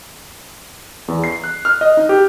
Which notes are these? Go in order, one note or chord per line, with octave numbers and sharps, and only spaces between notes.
E2
C7
F#6
F6
D#5
D#4
G4